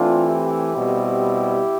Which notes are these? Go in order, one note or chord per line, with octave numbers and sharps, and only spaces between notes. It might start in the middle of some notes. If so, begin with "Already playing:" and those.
Already playing: E3 A3 C4 D4 F4
E4 G4
B2 G3 C4